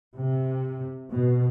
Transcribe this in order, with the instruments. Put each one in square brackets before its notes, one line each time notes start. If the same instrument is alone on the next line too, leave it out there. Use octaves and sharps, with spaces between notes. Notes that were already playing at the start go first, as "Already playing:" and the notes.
[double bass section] C3
B2